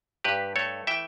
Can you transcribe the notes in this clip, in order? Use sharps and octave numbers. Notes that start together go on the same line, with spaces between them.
G2 G4 B4
A3 A4 C#5
E3 E5 G5